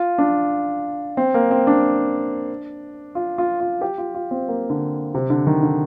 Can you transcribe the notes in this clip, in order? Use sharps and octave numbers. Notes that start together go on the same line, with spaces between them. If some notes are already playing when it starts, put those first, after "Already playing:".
Already playing: F4
D4
C4
A#3
C4
D4
F4
F4
F4
G4
F4
F4
C4
A#3
D3
C3
D3
D#3
D3